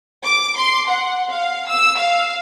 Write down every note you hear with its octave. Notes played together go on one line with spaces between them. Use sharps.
D6
C6
F#5
F5
E6
F5